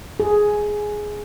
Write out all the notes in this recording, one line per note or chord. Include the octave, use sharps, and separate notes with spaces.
G#4